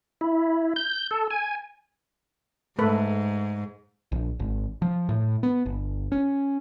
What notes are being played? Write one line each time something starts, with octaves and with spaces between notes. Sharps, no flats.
E4
G6
A4
G#5
G#2 A3 A4 B4
A#1
G#1
F3
A2
B3
G1
C#4